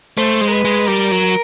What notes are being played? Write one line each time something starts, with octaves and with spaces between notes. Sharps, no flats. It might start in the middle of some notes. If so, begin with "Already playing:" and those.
A3 C5
G#3
A#4
B4
G#3
G3 A#4
F#3